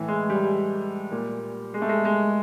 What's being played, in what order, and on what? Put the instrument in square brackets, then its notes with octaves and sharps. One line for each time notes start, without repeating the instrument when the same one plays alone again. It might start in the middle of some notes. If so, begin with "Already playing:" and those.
Already playing: [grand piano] A2 E3
G#3
G3
A#2
G#3
A3
G#3
G#3